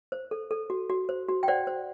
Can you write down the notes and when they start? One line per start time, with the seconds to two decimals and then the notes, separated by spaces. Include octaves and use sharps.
0.12 C5
0.31 A4
0.51 A4
0.70 F#4
0.90 F#4
1.09 C5
1.29 F#4
1.43 G5
1.48 C5 D5 F#5
1.67 C5